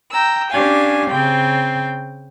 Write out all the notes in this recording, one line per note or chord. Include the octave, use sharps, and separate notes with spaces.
G5 A#5 E6
C#4 D4 G4 F5 G#5
C#3 C4 G5